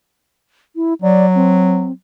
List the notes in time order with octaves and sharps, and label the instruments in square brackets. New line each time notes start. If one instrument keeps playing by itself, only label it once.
[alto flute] E4
[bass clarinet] F#3 [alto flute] D5
[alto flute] C4